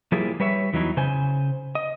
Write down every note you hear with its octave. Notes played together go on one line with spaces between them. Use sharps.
F3 G3 A#3 E4 G#4
G3 B4 C#5 E5
E2 E3 F#3 B3 D#4 E4
C#3 C5 G#5
D#5